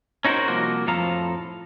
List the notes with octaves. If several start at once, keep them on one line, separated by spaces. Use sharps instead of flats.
C#4 D#4 F#4 G#4 A#4 C5
C2 F3 A#3 F#4
F2 A2 F3 A4 F5 A#5